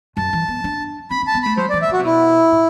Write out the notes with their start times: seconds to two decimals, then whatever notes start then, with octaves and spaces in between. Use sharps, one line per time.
0.17 F#2 A5
0.33 E3
0.48 B3
0.64 D4
1.10 C4 B5
1.22 C4
1.27 A5
1.34 B3
1.42 A3 B5
1.57 F#3 C5
1.69 D5
1.73 E3
1.82 E5
1.89 D3 F#4
1.99 C3
2.05 B2 E4
2.52 A2